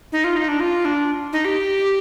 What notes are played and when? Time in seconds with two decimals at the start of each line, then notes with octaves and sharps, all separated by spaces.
0.12 D#4
0.24 F4
0.36 D#4
0.48 D4
0.60 F4
0.85 D4
1.33 D#4
1.45 G4